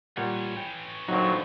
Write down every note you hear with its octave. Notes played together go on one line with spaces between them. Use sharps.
A#2 E3 G3 C#5 F#5
G5
A#2 D3 F#3 C4 D#4